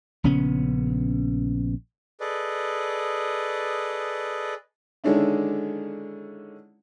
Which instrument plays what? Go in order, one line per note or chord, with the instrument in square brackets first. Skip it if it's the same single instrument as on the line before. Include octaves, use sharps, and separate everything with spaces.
[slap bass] A#1 C#3 B3 C#4
[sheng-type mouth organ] G#4 A4 B4 D5 D#5
[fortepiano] D3 D#3 G#3 C#4 D4 E4